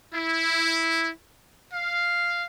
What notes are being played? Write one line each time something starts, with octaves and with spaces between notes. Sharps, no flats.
E4
F5